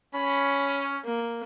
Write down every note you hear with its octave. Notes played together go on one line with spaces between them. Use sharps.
C#4 B5
A#3